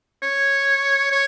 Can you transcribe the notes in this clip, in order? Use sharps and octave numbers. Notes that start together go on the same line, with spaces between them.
C#5
C#5